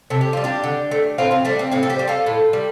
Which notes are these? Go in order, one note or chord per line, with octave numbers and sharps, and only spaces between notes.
C3 A4
G4
G3 F4
D4 G4
D3
A3
A2 C4 F4
C4 F4
G3 A3 D4
C4
A2 C4 F4
A4
G4 C5
G3
F4 A4
A2
G3